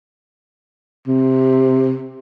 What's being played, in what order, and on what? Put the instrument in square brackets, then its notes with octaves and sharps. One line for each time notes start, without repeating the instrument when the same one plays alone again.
[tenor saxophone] C3